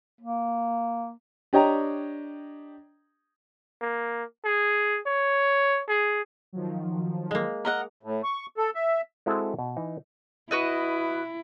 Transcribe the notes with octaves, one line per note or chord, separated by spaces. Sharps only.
A#3
D4 G4 C#5 D#5 G5 A#5
A#3
G#4
C#5
G#4
D#3 F3 F#3
G#3 A#3
A#4 D#5 F#5
A2
C#6
A4
E5
G#3 C4 E4 F#4 A4
B2
E3 D#4
E4 F#4 B4 D#5